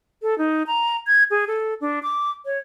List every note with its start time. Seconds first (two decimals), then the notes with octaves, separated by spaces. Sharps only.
0.22 A4
0.38 D#4
0.67 A#5
1.07 G#6
1.31 G#4
1.47 A4
1.81 D4
2.03 D6
2.45 C#5